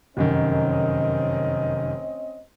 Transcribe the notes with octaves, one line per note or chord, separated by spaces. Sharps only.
F1 F#2 D#3 C4 C#4 D#5